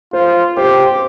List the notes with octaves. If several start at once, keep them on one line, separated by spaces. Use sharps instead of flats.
F4 C5
G4 C5